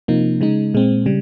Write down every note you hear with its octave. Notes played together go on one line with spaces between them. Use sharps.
C3 F3 A#3 D#4
C#3 G#3 D#4
A#2 G#3 C4
C#3 G3